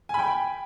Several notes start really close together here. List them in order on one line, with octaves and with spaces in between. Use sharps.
G#5 B5 G5